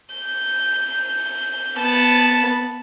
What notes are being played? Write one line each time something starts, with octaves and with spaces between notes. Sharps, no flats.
G6
B3 A5